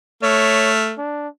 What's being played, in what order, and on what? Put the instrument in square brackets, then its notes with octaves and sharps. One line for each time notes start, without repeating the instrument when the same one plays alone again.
[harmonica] A3 F6 [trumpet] C#5
[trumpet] D4